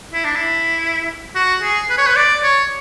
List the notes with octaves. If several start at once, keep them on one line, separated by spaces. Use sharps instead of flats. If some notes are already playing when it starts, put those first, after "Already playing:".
E4
D4
E4
F#4
G#4
B4
C#5
B4
D5
C#5